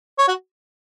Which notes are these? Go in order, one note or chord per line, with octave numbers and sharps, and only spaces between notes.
C#5
F#4